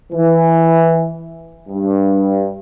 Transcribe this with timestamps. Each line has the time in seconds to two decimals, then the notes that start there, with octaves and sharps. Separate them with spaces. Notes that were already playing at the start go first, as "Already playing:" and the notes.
0.12 E3
1.68 G2